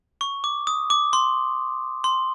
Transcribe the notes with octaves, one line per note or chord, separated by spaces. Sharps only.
C#6
D6
D#6
D6
C6
C6